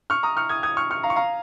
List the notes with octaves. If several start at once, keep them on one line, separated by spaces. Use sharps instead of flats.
C#6 F6
A#5 D#6
C#6 F6
D#6 G#6
D#6 G#6
C#6 F6
C#6 F6
F5 A#5
C#6
F5 A#5